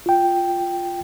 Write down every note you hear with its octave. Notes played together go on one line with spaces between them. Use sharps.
F4 G5